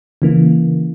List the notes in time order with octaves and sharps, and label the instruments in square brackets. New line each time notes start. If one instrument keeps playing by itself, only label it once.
[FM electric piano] C#3 E3 A#3